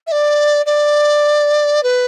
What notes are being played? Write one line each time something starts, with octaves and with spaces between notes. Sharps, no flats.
E5
D5
D5
B4